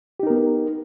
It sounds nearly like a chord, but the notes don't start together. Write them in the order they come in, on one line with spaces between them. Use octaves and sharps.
G4 D#4 A#4 B3